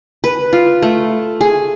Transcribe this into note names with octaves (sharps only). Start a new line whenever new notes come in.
B4
F4
A3
G#4